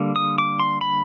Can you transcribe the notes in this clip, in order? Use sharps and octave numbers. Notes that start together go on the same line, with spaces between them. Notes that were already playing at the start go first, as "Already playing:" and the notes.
Already playing: D3 G3 A#3
D#6
D6
C6
B5